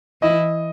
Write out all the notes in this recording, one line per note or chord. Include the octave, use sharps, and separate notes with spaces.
E3 E4 D#5